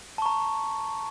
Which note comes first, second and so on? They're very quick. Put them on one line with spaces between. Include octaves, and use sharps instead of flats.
A5 C#6 A#5